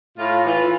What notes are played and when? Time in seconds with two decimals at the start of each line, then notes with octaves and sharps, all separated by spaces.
0.18 A2 F4
0.45 E3 F4